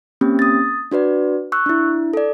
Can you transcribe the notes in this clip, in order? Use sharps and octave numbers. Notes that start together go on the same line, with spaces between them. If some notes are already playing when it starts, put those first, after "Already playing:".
A#3 C4 C#4 G4
D#6 A6
D4 F#4 B4 D5
C#6 E6 F#6
D4 E4
A4 D5